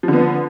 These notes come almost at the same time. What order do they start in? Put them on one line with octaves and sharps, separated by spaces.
F3 D3 B3